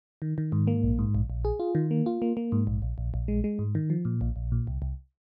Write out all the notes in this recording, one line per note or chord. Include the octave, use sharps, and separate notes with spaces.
D#3
D#3
G#2
A#3
A#1
G#2
A#1
A#1
G#4
F4
D#3
A#3
F4
A#3
A#3
G#2
A#1
A#1
A#1
A#1
G#3
G#3
G#2
D#3
F3
A#2
A#1
A#1
A#2
C2
C2